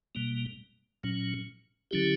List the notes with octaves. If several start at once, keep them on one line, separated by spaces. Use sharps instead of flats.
B2 G3 A#3
A#2 F#3 C#4
D3 F#3 C#4 E4 G4